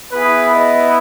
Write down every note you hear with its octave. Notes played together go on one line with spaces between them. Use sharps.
B3 E4 G#4 B4
B4 D#5